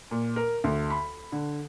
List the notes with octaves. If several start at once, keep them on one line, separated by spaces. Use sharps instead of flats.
A#2
A#4
D2
B5
D3